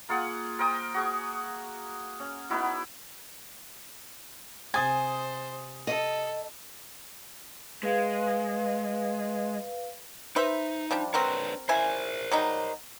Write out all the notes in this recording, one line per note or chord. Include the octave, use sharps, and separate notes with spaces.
A#3 F4 G#4 F#5
A#4 C5 G5 D#6
F#4 G#4 C#6
C#4
B3 D#4 E4 F#4
C3 C5 G#5 D#6 A6
A4 D#5
G#3 B4 F5
D#4 B4 C5 E5
F3 G3 D4
C4 D4 F#4 A#4 B4 C#5
C#3 E4 A#4 C5 G#5
F#3 G3 D#4